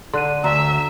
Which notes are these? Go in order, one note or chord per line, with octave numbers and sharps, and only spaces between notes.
D3 C6 F#6 D#7
D2 E5 A#5